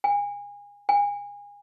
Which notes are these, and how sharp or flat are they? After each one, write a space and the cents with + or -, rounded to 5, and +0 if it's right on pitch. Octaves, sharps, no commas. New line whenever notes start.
G#5 -30
G#5 -30